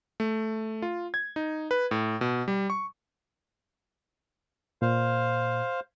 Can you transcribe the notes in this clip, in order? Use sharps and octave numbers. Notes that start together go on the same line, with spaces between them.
A3
F4
G#6
D#4
B4
A2
B2
G3
C#6
A#2 C5 F5